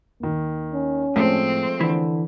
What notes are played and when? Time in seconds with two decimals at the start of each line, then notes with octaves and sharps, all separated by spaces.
0.20 D#2 D#3
0.74 C#4
1.16 A2 F3 G#3 A3 C4
1.81 D3 E3